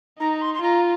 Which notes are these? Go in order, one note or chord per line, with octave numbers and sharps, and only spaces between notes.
D#4 A#5
C6
C6
F4 A#5